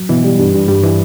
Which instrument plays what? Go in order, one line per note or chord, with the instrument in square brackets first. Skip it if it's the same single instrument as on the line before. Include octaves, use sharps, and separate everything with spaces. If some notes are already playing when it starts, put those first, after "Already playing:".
Already playing: [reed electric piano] F#3
[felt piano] B2 [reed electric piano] E3
[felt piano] G3
G2
G2
[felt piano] G2 [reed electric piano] G3
[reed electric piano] E3 [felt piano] E4